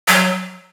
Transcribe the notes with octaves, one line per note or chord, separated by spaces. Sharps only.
F#3